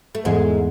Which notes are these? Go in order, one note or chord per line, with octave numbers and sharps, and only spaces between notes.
A3
E2 G#2 G#3